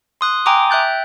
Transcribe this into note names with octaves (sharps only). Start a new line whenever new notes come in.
C6 D#6 F#6
G5 G#5 A#5 C6 D6 D#6
E5 G5 F#6 G6 A6